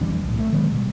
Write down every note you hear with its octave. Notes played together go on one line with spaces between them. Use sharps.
F1 E3 G3 D4
B1 A2
A3
D#3 F#3 G#3 B3
B2 G3